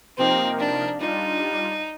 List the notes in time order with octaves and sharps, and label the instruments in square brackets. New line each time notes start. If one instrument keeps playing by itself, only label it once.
[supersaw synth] C3 F3 A#3 D#4 A#4 [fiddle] C4
[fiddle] D4
[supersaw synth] G3 D4 F4 [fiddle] D#4